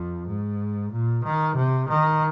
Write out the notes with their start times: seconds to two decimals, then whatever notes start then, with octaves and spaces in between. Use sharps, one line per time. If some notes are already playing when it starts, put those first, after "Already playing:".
Already playing: F2
0.28 G#2
0.92 A#2
1.24 D#3
1.56 C3
1.89 D#3